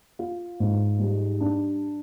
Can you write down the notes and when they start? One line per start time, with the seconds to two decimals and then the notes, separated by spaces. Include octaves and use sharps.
0.19 F4
0.60 G#2
0.99 G3
1.40 D4